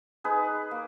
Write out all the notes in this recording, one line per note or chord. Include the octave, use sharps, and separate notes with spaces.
D#4 G#4 B4
A#3